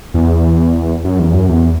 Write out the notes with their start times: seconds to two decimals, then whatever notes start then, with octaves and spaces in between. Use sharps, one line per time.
0.14 E2
1.04 F#2
1.19 E2
1.33 F#2
1.49 E2